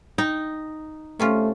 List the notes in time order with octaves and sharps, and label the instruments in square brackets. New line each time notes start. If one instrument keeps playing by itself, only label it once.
[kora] D#4 [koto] G5
[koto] C3 C#4 F4 [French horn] A3